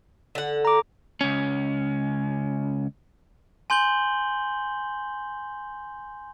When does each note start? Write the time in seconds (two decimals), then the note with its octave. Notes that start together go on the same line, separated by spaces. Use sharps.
0.35 D3 F#5
0.65 A#5 D6
1.21 C#2 C#4
3.70 G#5 C6 G6 F#7 G7